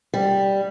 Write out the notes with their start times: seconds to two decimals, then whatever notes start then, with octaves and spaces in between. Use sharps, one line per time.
0.14 G3